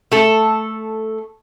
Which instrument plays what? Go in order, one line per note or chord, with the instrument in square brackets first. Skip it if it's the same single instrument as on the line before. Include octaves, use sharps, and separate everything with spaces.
[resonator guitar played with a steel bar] A3 A4